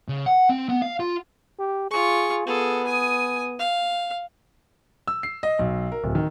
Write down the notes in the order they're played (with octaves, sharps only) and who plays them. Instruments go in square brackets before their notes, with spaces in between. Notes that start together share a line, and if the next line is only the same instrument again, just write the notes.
[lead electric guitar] C#3
F#5
C4
B3
F5
F4
[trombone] G4
[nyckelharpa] F4 C#6 [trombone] G#4
[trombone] B3 [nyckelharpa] G#4 A4
[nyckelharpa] G#5 D#6
F5
[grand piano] E6
C7
D#5
B1
A#4
D1
D#3